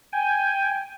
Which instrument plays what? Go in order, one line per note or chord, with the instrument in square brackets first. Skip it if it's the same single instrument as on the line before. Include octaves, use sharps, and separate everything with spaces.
[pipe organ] G5 G#5